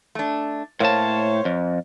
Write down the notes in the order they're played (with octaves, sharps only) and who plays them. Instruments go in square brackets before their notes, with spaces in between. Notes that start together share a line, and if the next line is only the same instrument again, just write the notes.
[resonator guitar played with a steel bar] A3 D4
[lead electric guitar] A2 A5 [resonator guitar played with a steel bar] A#3 [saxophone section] C5 C#5
[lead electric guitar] F2